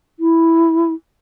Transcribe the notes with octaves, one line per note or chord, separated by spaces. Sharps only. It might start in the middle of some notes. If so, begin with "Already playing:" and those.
E4